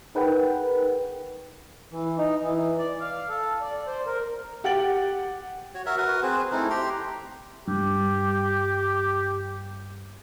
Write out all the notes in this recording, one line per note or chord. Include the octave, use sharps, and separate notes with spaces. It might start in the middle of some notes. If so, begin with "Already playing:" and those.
D#4 G#4 A#4 B4 F#5 G5
E3
D#4
E3
D5
F5
A4
D5
C5
A#4
G4 F#5 G5 A6 D7 F#7
F#4 C#5
F#4 A#4 E5
F#4 A#4 B4
C4 G#4 B4 C5
A3 C4 D#4 E4
G4 G5 A#5 C6
G2 G4